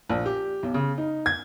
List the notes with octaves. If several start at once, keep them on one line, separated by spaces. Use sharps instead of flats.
A#1
G4
B1
C#3
D#4
G#6